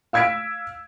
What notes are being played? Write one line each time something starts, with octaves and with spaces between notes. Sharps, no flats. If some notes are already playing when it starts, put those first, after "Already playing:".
F5 E6 G#6 B6 D7